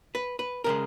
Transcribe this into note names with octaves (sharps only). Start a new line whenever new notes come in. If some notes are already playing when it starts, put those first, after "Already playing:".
B4
B4
C#3 G#3 A#4